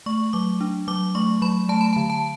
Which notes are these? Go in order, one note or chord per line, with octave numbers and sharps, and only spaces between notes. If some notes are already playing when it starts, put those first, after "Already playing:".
A3 C#6
F#3 D6
D4
F#3 D6
A3 C#6
F#3 B5
A3 A5
B5
D3 A5
A5